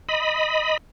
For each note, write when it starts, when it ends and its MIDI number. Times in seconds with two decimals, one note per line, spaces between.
0.09 0.77 75
0.09 0.77 83